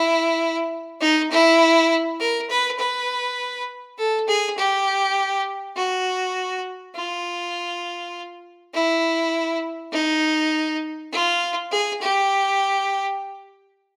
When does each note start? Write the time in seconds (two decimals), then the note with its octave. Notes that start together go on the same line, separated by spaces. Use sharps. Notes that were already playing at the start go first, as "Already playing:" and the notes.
Already playing: E4
1.01 D#4
1.31 E4
2.20 A#4
2.50 B4
2.79 B4
3.98 A4
4.28 G#4
4.57 G4
5.76 F#4
6.95 F4
8.74 E4
9.92 D#4
11.12 F4
11.72 G#4
12.01 G4